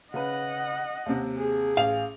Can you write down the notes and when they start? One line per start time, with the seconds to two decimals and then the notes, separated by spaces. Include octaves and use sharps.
0.14 C#3 B4 D#5 F#5
1.06 D#2 C3
1.38 G#4
1.77 A1 F5 F7